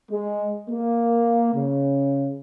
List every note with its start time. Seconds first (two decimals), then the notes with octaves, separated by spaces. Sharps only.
0.11 G#3
0.70 A#3
1.54 C#3